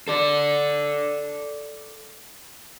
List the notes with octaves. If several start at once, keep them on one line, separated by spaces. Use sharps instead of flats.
A4 D5